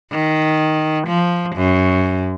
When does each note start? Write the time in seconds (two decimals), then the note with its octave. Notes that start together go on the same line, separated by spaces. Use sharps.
0.12 D#3
1.08 F3
1.56 F#2